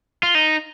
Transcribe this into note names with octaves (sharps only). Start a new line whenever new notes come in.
F4
D#4